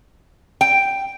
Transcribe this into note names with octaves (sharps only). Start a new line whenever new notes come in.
G5